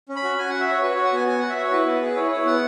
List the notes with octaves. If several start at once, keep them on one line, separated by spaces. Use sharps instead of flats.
C#4
B5
F#4
F#4 G#5
F#4 F#5
E5
F#4 C#5
F#4 B4
F#4 C#5
F#5
B3 G#5
F#4 G#5
F#4 F#5
E5
F#4 C#5
E4 B4
B3
G#4
E4 C#5
B4
E4 C#5
B3 F#5